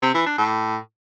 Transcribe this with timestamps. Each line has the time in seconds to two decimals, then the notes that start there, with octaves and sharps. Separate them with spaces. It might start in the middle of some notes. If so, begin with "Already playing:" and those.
0.02 C3
0.14 E3
0.26 D4
0.38 A2